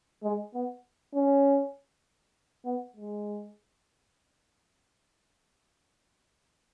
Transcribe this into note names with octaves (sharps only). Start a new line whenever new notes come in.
G#3
B3
C#4
B3
G#3